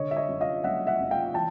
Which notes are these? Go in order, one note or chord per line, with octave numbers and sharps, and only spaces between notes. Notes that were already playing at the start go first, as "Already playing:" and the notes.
Already playing: D3 C#5 D#5
E5
C#5 D#5
F#2
D#5 F5
F#1 E5 F#5
E5 F#5
F#1
F5 G5
E3 G5 A5